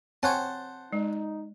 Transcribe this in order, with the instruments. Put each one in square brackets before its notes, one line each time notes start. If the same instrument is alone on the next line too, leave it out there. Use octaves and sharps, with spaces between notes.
[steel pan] C4 C#5 [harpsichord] C5 F#5 A5 [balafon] G#5
[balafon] G#3 [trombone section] D#4